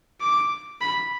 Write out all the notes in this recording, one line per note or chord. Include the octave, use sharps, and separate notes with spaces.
D6
B5